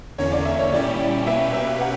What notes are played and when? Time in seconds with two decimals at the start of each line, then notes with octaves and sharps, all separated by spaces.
0.18 E2 D3 A#3 C#4 C#5
0.32 D5
0.45 E5
0.59 C#5
0.72 A#2 G3 C#4 E4 G4 D5
1.26 B2 A#3 C#4 G4 B4 E5
1.54 E5
1.81 F#5